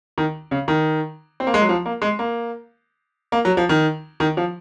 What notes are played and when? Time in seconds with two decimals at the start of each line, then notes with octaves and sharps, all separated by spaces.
0.18 D#3
0.51 C#3
0.68 D#3
1.40 C4
1.47 A#3
1.54 G#3
1.62 F#3
1.69 F3
1.86 A#3
2.02 G#3
2.19 A#3
3.32 A#3
3.45 F#3
3.57 F3
3.69 D#3
4.20 D#3
4.37 F3